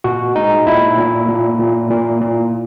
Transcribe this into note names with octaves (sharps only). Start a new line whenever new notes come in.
A#2 F#4
G#3 D#4
A#2 E4
A#2
A#2
A#2
A#2
A#2